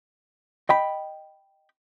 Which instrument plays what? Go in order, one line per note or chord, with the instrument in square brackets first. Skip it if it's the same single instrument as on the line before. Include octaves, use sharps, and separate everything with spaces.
[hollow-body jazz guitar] D#5 G5 B5